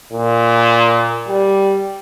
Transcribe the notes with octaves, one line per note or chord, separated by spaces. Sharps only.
A#2
G3